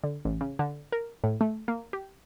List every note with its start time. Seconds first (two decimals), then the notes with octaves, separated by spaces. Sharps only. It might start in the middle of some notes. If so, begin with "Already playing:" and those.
0.04 D3
0.25 A1
0.41 C#3
0.59 D3
0.92 A#4
1.24 A2
1.41 A3
1.68 A#3
1.93 G4